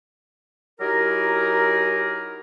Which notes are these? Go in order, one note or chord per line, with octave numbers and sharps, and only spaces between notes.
F#3 D#4 E4 G4 G#4 A#4